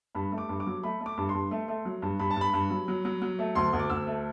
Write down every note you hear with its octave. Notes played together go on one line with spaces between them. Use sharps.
G2 B5
A3
D6
G2
D6
F#3
A3 B5
A3
D6
G2
C6
G2
A3
A3
F#3
G2
G2 B5
A5
G2 B5
G2
F#3
F#3
F#3
F#3
A3
D2 C6
D2
D6
D2 E6
A3